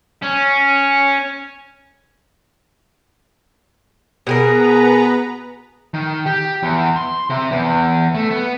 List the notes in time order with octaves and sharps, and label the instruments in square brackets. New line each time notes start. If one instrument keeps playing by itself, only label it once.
[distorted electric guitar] C#4
[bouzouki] B2 G#4 A#4 [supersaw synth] B3 B4 A#5
[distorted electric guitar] D#3
G4
E2
C6
C3
E2
A3
B3